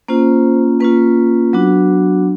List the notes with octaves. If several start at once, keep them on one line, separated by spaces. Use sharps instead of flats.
A#3 C#4 F4 C5
A#3 C#4 F4 B4
F#3 B3 D4 F#4